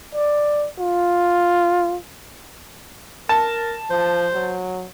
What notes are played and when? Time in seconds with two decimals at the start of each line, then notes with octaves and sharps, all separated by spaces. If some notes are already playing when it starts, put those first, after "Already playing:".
0.14 D5
0.79 F4
3.29 A#4 A5
3.90 F3 C5
4.33 F#3